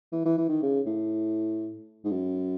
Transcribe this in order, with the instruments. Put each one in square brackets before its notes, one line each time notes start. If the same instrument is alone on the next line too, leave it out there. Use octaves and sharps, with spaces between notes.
[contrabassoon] E3
E3
E3
D#3
C#3
A2
G#2
F#2